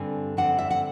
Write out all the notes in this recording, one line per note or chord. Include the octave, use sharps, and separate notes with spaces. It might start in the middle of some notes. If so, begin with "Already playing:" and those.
Already playing: G2 D3 G3 C4 G#5
G2 D3 G3 C4 F#5
E5
F#5